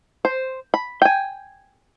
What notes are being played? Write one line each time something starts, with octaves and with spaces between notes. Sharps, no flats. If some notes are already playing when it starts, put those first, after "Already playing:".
C5
B5
G5 G#5